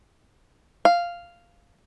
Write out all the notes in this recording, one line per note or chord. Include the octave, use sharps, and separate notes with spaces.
F5